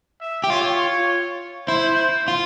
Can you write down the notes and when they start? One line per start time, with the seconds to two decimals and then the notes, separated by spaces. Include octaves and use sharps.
0.21 E5
0.44 G4
0.50 F4 C#5
1.68 E4 C5
2.28 F4